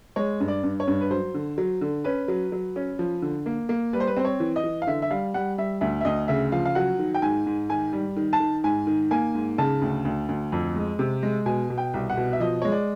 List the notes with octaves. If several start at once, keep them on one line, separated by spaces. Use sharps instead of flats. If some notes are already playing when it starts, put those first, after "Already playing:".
G#3 C#5
G2
D5
G2
C#5
G2
B4
F#3 C5
D3
F#3
D3
C#4 B4
F#3
F#3
C#4
F3
D3
A#3
A#3
G3 B4
C5
B4
C4 C5
C#5
E3
D#5
E3
F5
D3 E5
E5
G3 F5
G3 F#5
G3 E5
D2 E5
E5
D2 D#5
C#3 E5
F3 F5
F5
F#3 F#5
D#3
G5
G#2 G#5
G#2
D#3 G#5
G3
D#3
A5
D#3
G#2 G#5
D#3
A#3 G#5
G#2
C#3 A5
D2
D2
D2
F2
G#3
C3
G#3
B2 G#5
B2
G5
C2
F#5
B2
E5
F3 D#5
G#3 C#5
D5